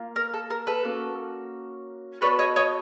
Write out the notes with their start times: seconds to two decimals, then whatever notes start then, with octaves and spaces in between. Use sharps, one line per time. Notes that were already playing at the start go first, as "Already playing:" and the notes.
Already playing: A#3 F4
0.16 A#4
0.34 A4
0.50 A#4
0.67 A4 B4
0.84 A#3 C#4 F#4
2.21 B3 D4 F#4 A4 B4 C#5
2.39 C#5 D#5
2.56 C#5 D#5